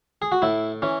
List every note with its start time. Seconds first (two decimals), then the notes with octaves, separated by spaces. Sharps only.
0.22 G#4
0.32 F#4
0.42 A2 E4
0.82 E3 C#4